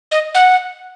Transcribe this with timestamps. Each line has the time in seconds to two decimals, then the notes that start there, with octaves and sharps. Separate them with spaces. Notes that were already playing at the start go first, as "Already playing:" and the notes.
0.12 D#5
0.35 F#5